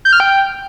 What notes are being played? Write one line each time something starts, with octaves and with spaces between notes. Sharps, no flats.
G6
F6
G5